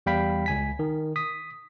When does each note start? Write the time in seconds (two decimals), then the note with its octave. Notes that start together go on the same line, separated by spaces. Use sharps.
0.06 E2 G3 F5 G5 B5 B6
0.46 C#2 G#5 B6
0.79 D#3
1.16 D#6 B6